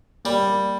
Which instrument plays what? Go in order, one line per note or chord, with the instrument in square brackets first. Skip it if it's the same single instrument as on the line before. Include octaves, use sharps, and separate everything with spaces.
[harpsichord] G3 [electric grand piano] A#3
[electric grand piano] A#3